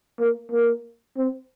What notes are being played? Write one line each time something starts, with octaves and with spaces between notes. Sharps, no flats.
A#3
A#3
C4